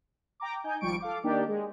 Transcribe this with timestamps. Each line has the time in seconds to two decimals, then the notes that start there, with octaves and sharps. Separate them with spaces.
0.40 G5 A#5 D6
0.64 D#4 G#5 G6
0.81 G#1 F3 G3 C#6 D7
1.00 A4 F5 D6
1.23 D#3 A#3 D4 D#4 G4
1.48 G#3